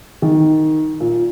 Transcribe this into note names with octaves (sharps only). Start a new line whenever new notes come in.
D#3
A#2